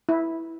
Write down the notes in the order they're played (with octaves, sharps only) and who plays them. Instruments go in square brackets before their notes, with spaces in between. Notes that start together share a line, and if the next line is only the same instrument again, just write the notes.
[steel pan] E4